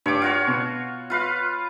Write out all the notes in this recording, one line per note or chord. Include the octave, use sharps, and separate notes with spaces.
G2 C#5 D6
F4 F#4 C#5
B2
F4 B4 F5